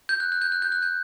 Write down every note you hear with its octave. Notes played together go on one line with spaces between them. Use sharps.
G6
F#6
F#6
G6
F#6
G6
F#6
G6